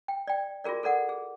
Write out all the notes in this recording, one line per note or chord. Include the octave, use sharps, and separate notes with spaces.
G5
D5 G5
F4 F#4 G#4 A#4 D5
A4 A#4 D5 F#5
G#4